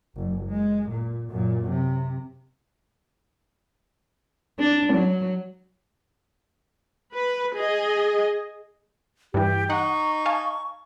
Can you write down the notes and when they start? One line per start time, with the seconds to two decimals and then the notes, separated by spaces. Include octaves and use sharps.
0.16 F#1 F#2
0.47 G#3
0.90 A#2
1.30 F#2 A#2
1.70 C3
4.59 D4
4.93 F#3
7.13 B4
7.56 G#4 D#5
9.34 G2 E3 G4
9.70 D#4 F#5 C#6
10.26 F5 G#5 A5